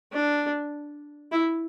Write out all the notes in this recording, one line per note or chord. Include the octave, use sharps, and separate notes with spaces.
D4
E4